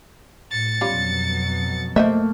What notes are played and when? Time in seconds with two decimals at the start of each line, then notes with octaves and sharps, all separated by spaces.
0.51 A2 A6 C#7
0.81 F2 B2 F#3 G3 C#4 F4
1.96 A3 A#3 C5 D#5 E5